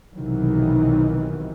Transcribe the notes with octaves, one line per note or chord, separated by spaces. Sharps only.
B1 C3 D#3 E3 F#3